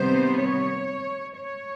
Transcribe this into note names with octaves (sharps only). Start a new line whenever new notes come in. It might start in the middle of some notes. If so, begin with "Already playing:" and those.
Already playing: C3 D#3 G3 B3 C5
C#5
C#5